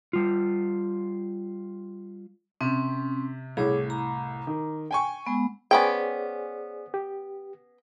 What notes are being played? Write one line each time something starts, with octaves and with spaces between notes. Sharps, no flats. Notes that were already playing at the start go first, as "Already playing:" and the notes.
G3 F4
C3 C4 C#4
C2 A2 G#4 C#5 D6
A#5 D6
D#3
G5 G#5 C#6
G#3 B3 F#5
B3 C#4 G#4 C5 D5 G5
G4